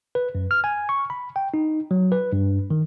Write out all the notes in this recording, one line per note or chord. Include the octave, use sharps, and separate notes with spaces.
B4
F#2
F6
G#5
C#6
B5
G5
D#4
F#3
B4
G2
D#3